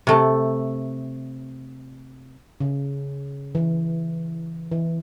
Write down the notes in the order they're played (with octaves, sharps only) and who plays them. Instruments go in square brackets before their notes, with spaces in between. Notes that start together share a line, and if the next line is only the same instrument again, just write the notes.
[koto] C3 A3
[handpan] C#3
E3
E3